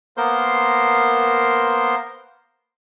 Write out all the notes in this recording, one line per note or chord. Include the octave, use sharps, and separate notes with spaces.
A#3 B3 A#4 C5 C6